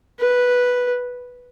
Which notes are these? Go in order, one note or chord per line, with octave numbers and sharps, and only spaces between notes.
B4